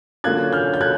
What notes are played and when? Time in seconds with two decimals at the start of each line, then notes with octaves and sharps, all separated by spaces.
0.24 D3 F#3 A#3 C#4 F4 F#6 G#6
0.53 F6 G6
0.74 G6
0.81 F#6 G#6